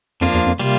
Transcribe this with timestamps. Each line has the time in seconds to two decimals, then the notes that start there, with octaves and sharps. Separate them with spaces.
0.21 F2 F3 A#3 D4 F4
0.34 E2
0.46 F2
0.59 C3 G3 A#3 F4